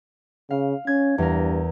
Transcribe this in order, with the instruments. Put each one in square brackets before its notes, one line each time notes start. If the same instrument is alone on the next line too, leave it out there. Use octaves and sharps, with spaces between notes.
[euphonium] C#3 [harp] F5
[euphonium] C#4 [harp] G#6
[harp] E2 A#4 [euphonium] G2